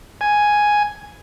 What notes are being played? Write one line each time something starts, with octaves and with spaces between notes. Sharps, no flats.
G#5